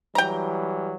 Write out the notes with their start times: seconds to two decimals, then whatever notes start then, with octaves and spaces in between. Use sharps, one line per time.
0.15 E3 F#3 G3 G5 A#5